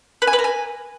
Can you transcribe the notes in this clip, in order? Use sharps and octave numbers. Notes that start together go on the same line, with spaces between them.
B4
G#5
B4
A#4
G#5